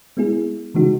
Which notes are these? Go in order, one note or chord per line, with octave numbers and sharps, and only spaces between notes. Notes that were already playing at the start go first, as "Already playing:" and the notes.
G#3 B3 E4 G#4
C#3 E3 G#3 D#4 F#4